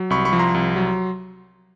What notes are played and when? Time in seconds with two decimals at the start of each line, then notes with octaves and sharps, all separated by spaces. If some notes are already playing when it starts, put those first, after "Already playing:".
Already playing: F#3
0.10 C2 B5 C#6
0.25 B5 C#6
0.33 F3
0.39 A#5 C6
0.54 C2
0.76 F#3